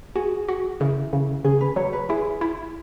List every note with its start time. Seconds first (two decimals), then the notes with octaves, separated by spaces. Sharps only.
0.16 F#4 G#4
0.49 F#4
0.80 C#3 E4
1.13 C#3
1.45 C#3 G#4
1.61 B4
1.76 F#3 C#5
1.93 B4
2.09 E4 G#4
2.41 E4